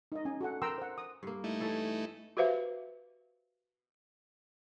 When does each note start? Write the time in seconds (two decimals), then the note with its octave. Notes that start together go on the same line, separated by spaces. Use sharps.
0.12 D#4 D#5
0.25 C#4 G#5
0.41 F#4 A4 F#5
0.62 A#4 G5 A#5 C6 E6
0.78 C5 F#5
0.98 D#6
1.23 G2 A#3
1.44 A3 D#4 E4
1.60 E3 A4 C#5
2.37 F#4 G4 B4 C5 E5 F5